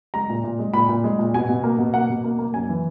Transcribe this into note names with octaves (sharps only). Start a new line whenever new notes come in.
G#3 A#5
A#2
A#2
G#3
A#2 B5
A#2
G#3
A#2
B2 G#5
B2
A#3
B2
A#3 F#5
B2
A#3
A#3
F#2 G#5
E3